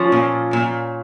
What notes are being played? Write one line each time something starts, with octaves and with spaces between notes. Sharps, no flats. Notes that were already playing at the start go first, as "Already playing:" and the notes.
Already playing: F3 C#4
A#2
A#2